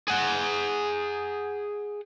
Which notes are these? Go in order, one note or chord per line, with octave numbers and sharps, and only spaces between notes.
G#4 F#5